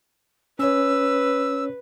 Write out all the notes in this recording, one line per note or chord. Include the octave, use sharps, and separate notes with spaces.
C#4 B4 C#5 E6